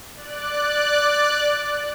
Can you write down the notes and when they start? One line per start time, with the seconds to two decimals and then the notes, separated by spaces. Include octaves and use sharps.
0.16 D5 F#6